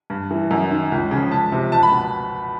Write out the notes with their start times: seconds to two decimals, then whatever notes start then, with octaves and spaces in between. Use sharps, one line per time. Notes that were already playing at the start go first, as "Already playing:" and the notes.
0.10 G2
0.31 E3
0.51 F#2
0.71 D#3
0.92 C#2
1.11 C#3 F3
1.32 C#2 A5
1.52 C3 F3
1.72 C#2 A5
1.83 B5
1.92 B2